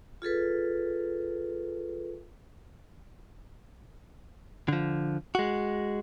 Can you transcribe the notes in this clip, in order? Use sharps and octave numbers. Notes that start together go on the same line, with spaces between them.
F4 G#4 A4 B4
D3 F3
G#3 F#4